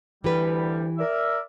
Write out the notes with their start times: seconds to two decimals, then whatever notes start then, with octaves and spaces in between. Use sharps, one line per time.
0.24 D2 E3 G3 G4 B4
0.98 A#4 D5 E5